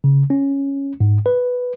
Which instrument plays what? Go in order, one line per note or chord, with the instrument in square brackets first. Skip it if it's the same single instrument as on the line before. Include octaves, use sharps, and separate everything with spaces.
[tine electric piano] C#3
C#4
G#2
B4